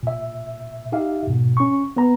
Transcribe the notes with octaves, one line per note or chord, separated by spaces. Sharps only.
A#2 E5
D#4 G4 E5 F5
G#2 B2
C#4 C#6
B3 B4 A#5